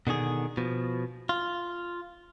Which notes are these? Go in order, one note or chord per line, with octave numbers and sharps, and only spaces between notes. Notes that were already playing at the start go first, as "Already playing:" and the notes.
B2 D3 D#3 G#4
B2 F3
F4